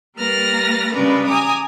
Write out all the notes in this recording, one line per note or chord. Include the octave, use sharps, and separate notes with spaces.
G3 A#3 B4 F6 A6 A#6
C#3 G3 G#3 D4 A#4 B4
G#5 A#5 D6 D#6